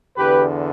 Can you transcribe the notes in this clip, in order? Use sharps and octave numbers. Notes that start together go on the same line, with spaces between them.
E2 D3 G4 B4